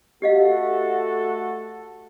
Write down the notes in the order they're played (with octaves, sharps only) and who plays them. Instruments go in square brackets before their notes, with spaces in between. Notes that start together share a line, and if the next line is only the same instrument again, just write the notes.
[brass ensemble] A3 F#4 A4 [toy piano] G4 D#5 F5